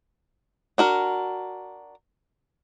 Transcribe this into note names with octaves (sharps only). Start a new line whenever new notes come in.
D4 F#4 A#4